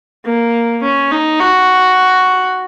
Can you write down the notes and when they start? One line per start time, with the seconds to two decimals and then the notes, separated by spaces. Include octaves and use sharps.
0.25 A#3
0.82 C#4
1.11 D#4
1.40 F#4